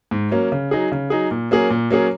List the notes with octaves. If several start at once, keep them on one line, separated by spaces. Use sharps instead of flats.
G#2
F#3 A#3 C#4
C#3
F#3 D#4 G#4
C#3
F#3 D#4 G#4
A#2
F#3 A#3 C#4 G#4
A#2
F#3 A#3 C#4 G#4